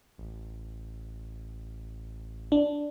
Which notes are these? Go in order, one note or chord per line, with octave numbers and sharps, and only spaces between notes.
A1
D4